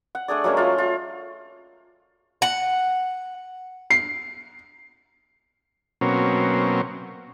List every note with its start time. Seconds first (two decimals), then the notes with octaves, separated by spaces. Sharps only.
0.15 F#5
0.28 A3 D4 G#4 D5
0.44 F#3 G#3 A#3 C#4
0.57 A3 F4
0.78 F4
2.42 F#5
3.90 C7
6.01 B2 F#3 A#3 C4 C#4